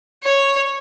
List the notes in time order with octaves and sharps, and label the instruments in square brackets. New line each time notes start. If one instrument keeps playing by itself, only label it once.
[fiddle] C#5